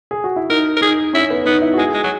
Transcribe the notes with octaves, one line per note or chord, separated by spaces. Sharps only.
G#4
F#4
E4
D#4 A#4
A#4
D#4 G#4
C#4 E4
B3
B3 D#4
E4
F#4
G#3 G#4
G#3
F#3